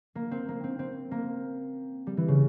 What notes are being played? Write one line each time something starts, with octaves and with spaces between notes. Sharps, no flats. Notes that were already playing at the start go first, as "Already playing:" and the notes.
A#3
C4
A#3
C4
C4
A#3
G3
E3
C#3